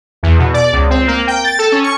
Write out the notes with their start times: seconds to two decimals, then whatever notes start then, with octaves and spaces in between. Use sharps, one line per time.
0.23 E2
0.39 B2
0.54 D5
0.73 C#2
0.90 C4
1.07 A#3
1.27 G5
1.44 A6
1.59 A4
1.72 C#4
1.84 C#6